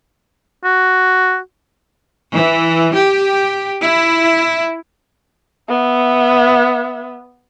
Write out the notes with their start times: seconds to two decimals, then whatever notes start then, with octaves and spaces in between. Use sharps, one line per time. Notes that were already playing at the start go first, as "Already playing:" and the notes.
0.64 F#4
2.32 E3
2.95 G4
3.81 E4
5.69 B3 E5